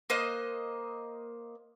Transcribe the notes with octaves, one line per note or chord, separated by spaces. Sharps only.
A#3 C5 D#5 F#6